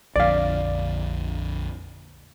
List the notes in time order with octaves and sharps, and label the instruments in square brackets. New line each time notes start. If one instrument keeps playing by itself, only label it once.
[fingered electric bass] A#1 F2 D3 [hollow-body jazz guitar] D5 F5